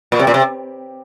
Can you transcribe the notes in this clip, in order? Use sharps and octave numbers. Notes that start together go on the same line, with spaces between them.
A#2
C3
A#2
C3